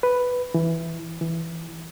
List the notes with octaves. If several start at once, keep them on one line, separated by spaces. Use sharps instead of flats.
B4
E3
E3